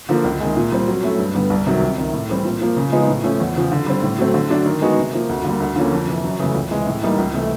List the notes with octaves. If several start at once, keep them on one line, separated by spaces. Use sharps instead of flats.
D3 F3 A#3
C#2
C3 D#3 G#3
A#2
G3 C4
F#3
A3 C#4 E4
G2
D3 G3 B3
C2
C3 D#3 F#3
C#2
C3 D#3
A2
E3 G3 C4
A#2
F3 A#3
C#3
F3 G#3 B3 D#4
A2
F3 A3 C#4
E2
C#3 F3
D3
G3 C4
A2
F#3 A3 C4
D3
F#3 A3 D4
D#3
G#3 B3 D#4 F#4
C3
F3 A#3
D2
D3 G3 A#3
D2
D3 F3 A#3 C#4
F2
C3 E3
F#2
C#3 E3 A3
C#2
C3 E3 G#3
A2
E3 G3 A#3 D#4
C#2
C3 E3 A3